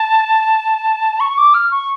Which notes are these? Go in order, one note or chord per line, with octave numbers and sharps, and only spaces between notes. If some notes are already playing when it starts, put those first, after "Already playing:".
Already playing: A5
C#6
D6
F6
C#6